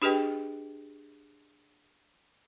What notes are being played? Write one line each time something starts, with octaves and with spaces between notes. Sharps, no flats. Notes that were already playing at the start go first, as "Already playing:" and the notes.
D4 G4 G#4 B4 D#5 G5